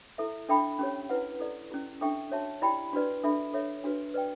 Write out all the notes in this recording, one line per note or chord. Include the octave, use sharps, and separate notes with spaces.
E4 A4 E5
D4 A4 E5 G5 B5
C#4 G4 C#5
E4 B4 F#5
E4 A4 D5
C#4 E4 G4
D4 A4 E5 G5 C#6
F#4 C#5 E5 A5
E4 G4 D5 G5 B5
D4 F#4 B4 D5
D4 A4 E5 B5
A4 C#5 E5
D4 F#4 B4
B4 D5 G5